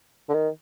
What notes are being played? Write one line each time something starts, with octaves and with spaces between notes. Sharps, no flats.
D3
D#3